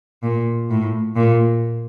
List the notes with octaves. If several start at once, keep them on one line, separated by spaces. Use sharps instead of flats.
A#2
A2
A#2